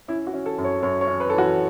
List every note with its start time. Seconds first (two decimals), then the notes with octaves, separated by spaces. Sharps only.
0.08 C#4 E4
0.27 F#4
0.34 C#4
0.46 A4
0.58 F#2
0.64 C#5
0.82 F#2 C#5
1.01 C#5
1.07 C#4
1.20 B4
1.30 E3 A4
1.38 F#4